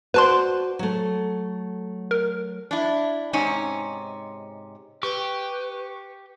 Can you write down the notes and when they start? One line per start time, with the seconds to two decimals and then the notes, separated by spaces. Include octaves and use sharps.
0.14 F#4 B4 C5 D5 A5 C6
0.79 F#3 A3
2.11 A#4
2.71 D4 E4
3.33 G#2 C3 C#4 D#4
5.03 G4 B4 C#6